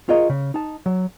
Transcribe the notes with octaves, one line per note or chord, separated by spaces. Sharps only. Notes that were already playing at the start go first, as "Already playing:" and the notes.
F4 G#4 A#4 C#5 D#5
C#3
D#4 A5
F#3